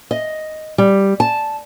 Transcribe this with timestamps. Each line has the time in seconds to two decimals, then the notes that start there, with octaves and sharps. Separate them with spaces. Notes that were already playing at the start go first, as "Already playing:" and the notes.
0.11 D#5
0.78 G3
1.20 A5